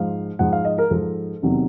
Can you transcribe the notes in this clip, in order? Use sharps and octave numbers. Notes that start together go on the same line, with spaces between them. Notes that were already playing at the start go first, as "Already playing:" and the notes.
Already playing: G#2 F3 F5
G#2 F3 F#5
F5
D#5
A#4
G#2 F3 A4
E2 C3 D#3 F#3